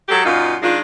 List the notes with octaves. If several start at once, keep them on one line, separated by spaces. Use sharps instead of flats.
F#3 G#3 G4 A4
F#2 A#2 D#4 F4
D#3 G#3 D4 F4